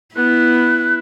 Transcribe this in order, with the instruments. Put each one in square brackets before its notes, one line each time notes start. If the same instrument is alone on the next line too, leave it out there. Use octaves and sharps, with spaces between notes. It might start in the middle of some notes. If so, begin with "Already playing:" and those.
[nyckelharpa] B3 [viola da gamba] E4 [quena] F#6